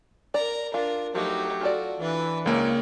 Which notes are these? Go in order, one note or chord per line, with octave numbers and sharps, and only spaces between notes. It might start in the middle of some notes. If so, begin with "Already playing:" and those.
A#4 D5 A#5
D4 F4 A#4
F3 F#3 A3 D#4 F#4 G4
F4 F#4 A4 D5
E3 D4 B4
C#2 G#3 A#3 E4 C#5